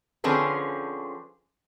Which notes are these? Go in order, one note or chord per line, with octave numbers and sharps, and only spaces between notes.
D3 F3 C4 C#4 G#4 B4